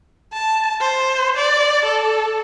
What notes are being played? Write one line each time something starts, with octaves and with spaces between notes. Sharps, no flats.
A5
C5
D5
A4